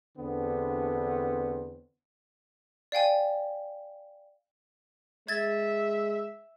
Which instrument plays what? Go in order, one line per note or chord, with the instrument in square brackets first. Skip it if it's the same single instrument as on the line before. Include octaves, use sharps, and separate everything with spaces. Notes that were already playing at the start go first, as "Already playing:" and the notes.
[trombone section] E2 D3 B3 C4 D4
[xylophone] D5 F5 G5 G#5
[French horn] G#3 [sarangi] E5 [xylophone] G#6 A6